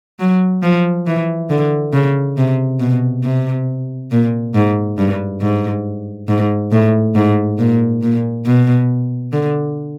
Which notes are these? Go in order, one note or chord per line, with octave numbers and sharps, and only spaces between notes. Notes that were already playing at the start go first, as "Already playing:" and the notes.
F#3
F3
E3
D3
C#3
C3
B2
C3
A#2
G#2
G2
G#2
G#2
A2
G#2
A#2
A#2
B2
D3